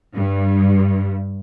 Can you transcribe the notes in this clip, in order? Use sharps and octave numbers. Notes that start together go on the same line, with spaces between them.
G2